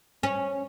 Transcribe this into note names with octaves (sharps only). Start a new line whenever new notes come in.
C#4